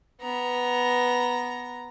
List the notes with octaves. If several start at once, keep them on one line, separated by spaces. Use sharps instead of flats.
B3 A#5